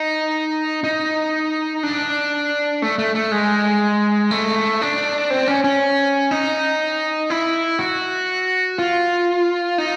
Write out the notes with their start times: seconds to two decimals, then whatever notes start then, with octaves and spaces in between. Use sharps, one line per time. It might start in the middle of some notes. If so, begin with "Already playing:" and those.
Already playing: D#4
0.84 D#4
1.83 D4
2.82 A3
2.99 A3
3.15 A3
3.32 G#3
4.31 A3
4.82 D4
5.30 C4
5.48 C#4
5.64 C#4
6.31 D#4
7.30 E4
7.79 F#4
8.78 F4
9.78 D#4